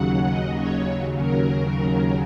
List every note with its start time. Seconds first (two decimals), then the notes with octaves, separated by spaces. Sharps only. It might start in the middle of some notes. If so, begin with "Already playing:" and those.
Already playing: D#2 C#3 F#3 F#5
0.29 D#5
0.58 C#5
1.19 A#4
1.65 A#4